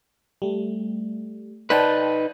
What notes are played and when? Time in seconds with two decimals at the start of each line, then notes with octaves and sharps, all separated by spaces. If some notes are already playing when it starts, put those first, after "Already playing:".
0.42 G3 A3
1.70 D#4 B4 C5 D5 G5 A5